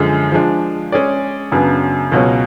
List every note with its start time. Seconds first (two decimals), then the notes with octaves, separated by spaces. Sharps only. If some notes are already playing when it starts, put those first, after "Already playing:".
Already playing: F#2 D3 F3 G#3
0.32 F3 G#3 D4
0.92 G#3 C#4 G#4 D5
1.52 F#2 C#3 F#3 B3 D4
2.12 C#2 B2 F#3 C#4